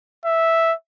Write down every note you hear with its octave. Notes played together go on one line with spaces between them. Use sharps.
E5